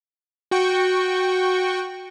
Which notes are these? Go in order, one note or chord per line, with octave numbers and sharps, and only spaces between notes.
F#4 G5 C#6